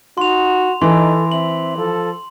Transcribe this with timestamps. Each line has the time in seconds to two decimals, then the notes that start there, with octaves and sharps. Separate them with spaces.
0.18 D#4 F#4 C6 F7
0.82 E3 D#4 A4 C6
1.32 C4 E5 F#7
1.77 F3 A4